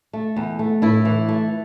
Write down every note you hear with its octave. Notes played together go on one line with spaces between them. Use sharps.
A3
E2
A3
A2 E4
E3
A3